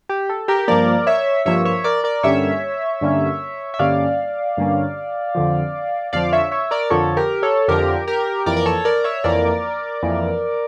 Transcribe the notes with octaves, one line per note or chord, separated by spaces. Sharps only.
G4
A4
G4 A#4
G2 F3 A#3 A#4 D5
C#5 E5
G2 F3 A#3 C#5 E5
C#5 E5
A#4 D5
A#4 D5
G2 D3 G3 A#3 C#4 C#5 E5
G2 D3 G3 A#3 C#4
E5
G2 D3 G3 A#3 C#4 D5 F5
G2 D3 G3 A#3 C#4
F2 D3 F3
F2 D3 F3 D5 F5
C#5 E5
C#5 E5
A#4 D5
F2 D3 F3 A4 C#5
G4 A#4
A4 C#5
F2 D3 F3 G4 A#4
G4 A#4
F2 E3 A#3 A#4 D5
A#4
A4 C#5
A#4 D5
C#5 E5
F2 E3 A#3 A#4 D5
F2 E3 A#3